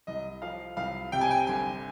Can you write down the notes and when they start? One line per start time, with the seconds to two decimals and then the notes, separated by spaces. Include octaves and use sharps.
0.07 C2 D#5
0.42 F3 F5
0.77 C2 F5
1.12 C3 G5
1.21 G#5
1.31 G5
1.47 G1 G#5